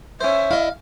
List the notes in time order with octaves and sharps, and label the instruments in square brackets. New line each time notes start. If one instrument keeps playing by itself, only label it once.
[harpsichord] C#4 C5 [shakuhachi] E5
[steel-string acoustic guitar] E4 D5 D#5 [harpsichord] F5